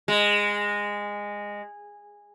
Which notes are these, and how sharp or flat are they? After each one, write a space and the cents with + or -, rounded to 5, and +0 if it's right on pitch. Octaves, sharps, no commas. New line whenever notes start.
G#3 -15